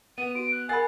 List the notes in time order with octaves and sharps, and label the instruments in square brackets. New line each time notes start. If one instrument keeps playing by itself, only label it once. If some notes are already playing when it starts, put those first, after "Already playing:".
[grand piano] B3 [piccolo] D#7
[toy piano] F#4 [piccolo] D7
[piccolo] F#6
[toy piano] G#4 A#4 B5 [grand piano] F#5 A6 C7 [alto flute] G#5